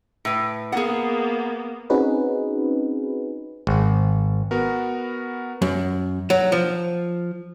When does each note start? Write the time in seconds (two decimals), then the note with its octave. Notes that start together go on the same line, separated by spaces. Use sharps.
0.25 A2 B4
0.72 A#3 B3 G#4 F#5
1.90 C4 C#4 D#4 F#4 G#4 B4
3.67 G#1
4.51 B3 F#4 A#4
5.62 F#2
6.30 F#3
6.52 F3